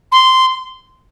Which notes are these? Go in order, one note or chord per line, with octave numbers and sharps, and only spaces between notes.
C6